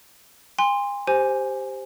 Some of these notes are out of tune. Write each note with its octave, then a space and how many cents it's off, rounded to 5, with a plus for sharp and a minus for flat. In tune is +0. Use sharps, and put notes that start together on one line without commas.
G#5 -40 C6 +0
G4 +0 C5 +0 G#5 +0